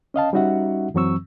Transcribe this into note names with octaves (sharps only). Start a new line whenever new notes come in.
C#4 D#5 F5 A5
G3 C#4 D#4 F#4 E5 F#5
F#2 E3 F#3 C4 C#6 E6